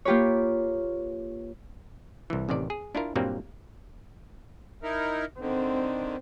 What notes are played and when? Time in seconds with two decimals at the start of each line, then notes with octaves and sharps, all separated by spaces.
0.05 A#3 F4 G4 B4 C#5
2.30 C2 E3
2.49 A1 C3 D#3 D5
2.70 G#4
2.95 D4 E4 F4 A#4
3.16 G2 A#2 F#3 G3 A#3 C4
4.83 D#4 E4 A#4
5.40 D3 D#3 C4